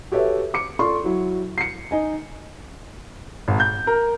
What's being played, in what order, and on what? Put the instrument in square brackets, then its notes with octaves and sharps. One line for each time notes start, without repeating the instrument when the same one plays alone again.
[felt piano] F#4 G4 A4 B4 C#5 E5
D6 C#7
F4 A4 D5 C6 C#6
F#3 E4
C7 C#7
D#4 D#5 G#5
[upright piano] G#1
G6
A#4